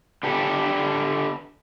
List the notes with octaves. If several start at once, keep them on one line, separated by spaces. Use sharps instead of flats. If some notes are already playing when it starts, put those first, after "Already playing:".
D3 G4 A4 B4